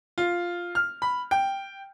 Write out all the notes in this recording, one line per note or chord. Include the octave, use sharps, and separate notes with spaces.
F4
F6
B5
G5